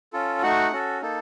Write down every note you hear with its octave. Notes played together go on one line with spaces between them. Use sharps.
C#4 F4 A4
A3 D#4 F#4 F#5
C#4 F#4 A4
A#3 D#4 A4